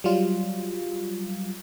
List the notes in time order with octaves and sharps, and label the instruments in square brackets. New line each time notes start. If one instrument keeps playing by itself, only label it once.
[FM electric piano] F#3 G3 F4